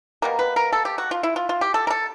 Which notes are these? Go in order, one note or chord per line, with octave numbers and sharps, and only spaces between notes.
B2 G3 A#3 A#4
B4
A#4
A4
G4
F#4
F4
E4
F4
F4
G4
A4
A#4
A4